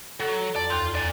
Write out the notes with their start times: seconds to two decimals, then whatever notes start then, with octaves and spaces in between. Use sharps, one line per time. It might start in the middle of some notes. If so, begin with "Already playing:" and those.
0.20 F#3 A4
0.56 F2 D5
0.70 D#2 F4 G6
0.95 D5 G#5